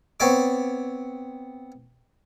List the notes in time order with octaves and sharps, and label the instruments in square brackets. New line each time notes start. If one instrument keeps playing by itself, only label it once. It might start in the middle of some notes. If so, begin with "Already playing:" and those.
[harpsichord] B3 C4 C#5 D5 D6